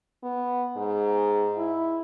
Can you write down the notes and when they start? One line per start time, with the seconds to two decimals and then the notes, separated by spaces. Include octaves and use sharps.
0.23 B3
0.76 G#2
1.58 E4